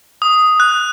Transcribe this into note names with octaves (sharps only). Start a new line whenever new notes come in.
D#6
F#6